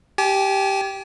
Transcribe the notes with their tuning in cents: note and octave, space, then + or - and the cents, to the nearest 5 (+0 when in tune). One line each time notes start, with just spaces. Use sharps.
G4 -5 G#5 +40